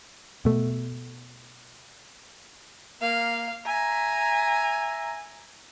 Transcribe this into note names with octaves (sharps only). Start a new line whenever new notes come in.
B2 A3
A#3 F5
E5 G#5 A#5